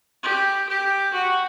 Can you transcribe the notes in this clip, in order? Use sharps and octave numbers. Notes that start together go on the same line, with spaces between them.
G4
G4
F#4